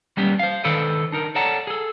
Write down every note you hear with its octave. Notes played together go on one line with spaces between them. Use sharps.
G3 A#3 B3 C#4 G4
C5 F5
D#3 D4 A4 B4 C5 D5
D4 D#4 A#4
A4 C#5 D5 F#5 A5 A#5
G#4 A4